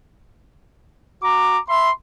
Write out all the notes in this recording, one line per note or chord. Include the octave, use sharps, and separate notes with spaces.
F#4 A#5 D6
E5 B5 C6